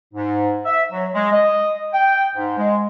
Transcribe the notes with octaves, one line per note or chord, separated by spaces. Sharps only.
G#2
E5
F#3
G#3
D#5
G5
G#2
G#3